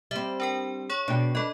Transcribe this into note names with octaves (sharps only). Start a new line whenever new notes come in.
G3 C4 E5
D4 A#4 G5
G#4 C#5 C#6
B2 D4 G5
D4 A4 B4 D#5